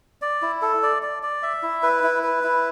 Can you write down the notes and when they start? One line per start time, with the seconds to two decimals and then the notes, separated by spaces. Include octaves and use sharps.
0.22 D5
0.42 E4
0.62 A4
0.83 D5
1.02 D5
1.23 D5
1.43 E5
1.63 E4
1.83 B4
2.03 E4
2.23 B4
2.43 E4